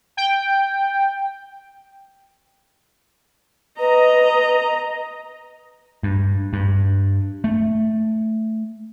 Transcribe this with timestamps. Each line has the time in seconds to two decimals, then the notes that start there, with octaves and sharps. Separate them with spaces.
0.17 G5
3.79 B4 D#5 A#5
6.03 G2
6.53 G2
7.44 A3